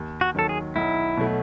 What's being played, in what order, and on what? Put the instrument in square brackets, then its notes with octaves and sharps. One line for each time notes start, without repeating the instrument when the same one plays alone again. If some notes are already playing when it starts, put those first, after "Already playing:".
Already playing: [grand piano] D#2
[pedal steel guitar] F#4
[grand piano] D#3 F#3 [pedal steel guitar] A4
[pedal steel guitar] G#4
[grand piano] B1 [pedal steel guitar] E4
[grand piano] B2 F#3 A3